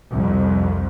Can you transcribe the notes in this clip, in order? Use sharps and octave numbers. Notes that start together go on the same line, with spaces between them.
C2 F2